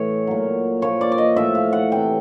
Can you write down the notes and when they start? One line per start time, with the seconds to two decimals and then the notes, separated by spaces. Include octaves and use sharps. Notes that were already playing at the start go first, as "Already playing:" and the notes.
Already playing: A2 E3 C#5
0.27 A#2 F#3
0.82 A#2 F3 C#5
1.01 D5
1.12 D5
1.18 D#5
1.36 A2 F3 E5
1.55 F5
1.73 F#5
1.91 C3 E3 G5